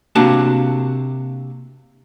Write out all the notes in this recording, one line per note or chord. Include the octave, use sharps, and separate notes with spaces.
C3 A#3 D4 F#4 A5